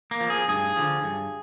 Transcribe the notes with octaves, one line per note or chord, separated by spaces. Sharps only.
A#3
F3
G#4
G2 G#4
D3 F3
G2